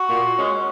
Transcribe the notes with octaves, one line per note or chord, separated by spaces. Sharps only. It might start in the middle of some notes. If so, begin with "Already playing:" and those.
Already playing: F#4
A#2
G#3 C#4